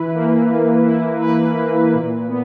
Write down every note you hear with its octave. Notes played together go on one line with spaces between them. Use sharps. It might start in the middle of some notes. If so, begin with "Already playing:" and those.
Already playing: E3 E4 B4
A#3
E3
E4
B4
A#3
A#2
B3